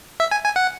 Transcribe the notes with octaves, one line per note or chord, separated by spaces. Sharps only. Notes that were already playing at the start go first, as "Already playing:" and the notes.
E5
G#5
G#5
F#5